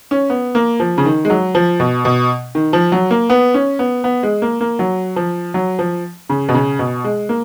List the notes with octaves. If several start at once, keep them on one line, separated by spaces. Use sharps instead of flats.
C#4
B3
A#3
F3
C#3
D#3
G#3
F#3
F3
B2
B2
D#3
F3
F#3
A#3
B3
C#4
B3
B3
G#3
A#3
A#3
F#3
F3
F#3
F3
C#3
B2
C#3
B2
G#3
A#3